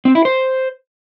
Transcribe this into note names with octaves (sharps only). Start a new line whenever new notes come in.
C4
E4
C5